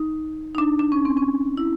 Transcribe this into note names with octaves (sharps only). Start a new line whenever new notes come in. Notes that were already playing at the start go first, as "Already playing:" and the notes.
Already playing: D#4
D#4
D4
D4
C#4
C4
C#4
E4